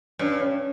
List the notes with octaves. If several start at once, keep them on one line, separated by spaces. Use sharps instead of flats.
G2 C#4
C#4